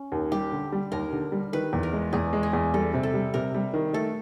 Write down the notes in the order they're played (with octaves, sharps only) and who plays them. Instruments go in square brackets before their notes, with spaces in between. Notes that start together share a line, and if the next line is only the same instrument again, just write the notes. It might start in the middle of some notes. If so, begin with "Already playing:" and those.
Already playing: [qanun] C#4
[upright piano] D#2
[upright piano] G3 [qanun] G4
[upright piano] D3
G3
[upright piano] D#2 [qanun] A#4
[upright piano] D3
G3
[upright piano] D#3 [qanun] B4
[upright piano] E2
[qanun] A#4
[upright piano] G#3
[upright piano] E2 [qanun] G#4
[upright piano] G#3
[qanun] G#4
[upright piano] E2
[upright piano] G3 [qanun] A4
[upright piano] C3
[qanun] A4
[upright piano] G3
[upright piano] C3 [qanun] A#4
[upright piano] G3
D#3
[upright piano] A3 [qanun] A4